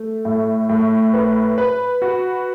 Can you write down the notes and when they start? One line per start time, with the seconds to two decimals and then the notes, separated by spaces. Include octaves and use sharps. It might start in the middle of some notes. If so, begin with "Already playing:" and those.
Already playing: A3
0.25 A2
0.69 A2
1.14 B4
1.58 B4
2.02 F#4